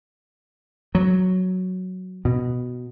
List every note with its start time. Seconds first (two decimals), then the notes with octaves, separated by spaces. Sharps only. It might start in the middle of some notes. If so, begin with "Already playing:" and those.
0.95 F#3
2.25 B2